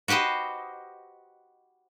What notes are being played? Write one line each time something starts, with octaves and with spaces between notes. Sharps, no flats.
F#4 G4 B4 C5 D#5